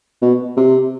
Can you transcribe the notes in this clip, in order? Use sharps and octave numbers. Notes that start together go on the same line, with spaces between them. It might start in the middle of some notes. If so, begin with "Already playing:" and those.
B2
C3